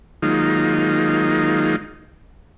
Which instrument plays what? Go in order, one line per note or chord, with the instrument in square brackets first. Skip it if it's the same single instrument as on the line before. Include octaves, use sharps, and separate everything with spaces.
[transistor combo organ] D#3 F#3 G#3 A#3 D#4 F4